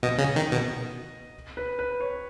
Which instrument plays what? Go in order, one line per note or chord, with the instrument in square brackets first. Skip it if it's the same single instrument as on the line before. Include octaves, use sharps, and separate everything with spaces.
[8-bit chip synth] B2 [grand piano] D#5
[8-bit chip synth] C#3
D#3
B2
[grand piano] B4
B4
C#5